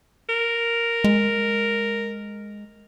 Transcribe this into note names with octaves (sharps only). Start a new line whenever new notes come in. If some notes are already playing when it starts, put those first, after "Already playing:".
A#4
G#3